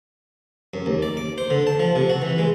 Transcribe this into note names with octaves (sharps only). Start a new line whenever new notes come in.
F#2
D#2
D5
D6
C5
D3
A5
F3
C3
F#4
E3
G#3